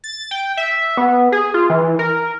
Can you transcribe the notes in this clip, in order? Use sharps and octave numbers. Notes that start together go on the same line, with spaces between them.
A6
G5
E5
B3
G#4
F4
E3
A#4